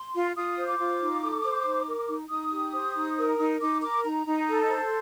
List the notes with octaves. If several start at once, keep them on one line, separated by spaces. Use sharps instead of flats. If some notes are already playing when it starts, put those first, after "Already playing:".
Already playing: C6
F4
F4 D#6
C5
D6
F4
D#4
A4
C5
D#4
A#4
D#4
D#4 D#6
G4
C5
D#4
A#4
D#4
D#4 D6
A#4 D6
D#4 A#5
D#4
A4
C5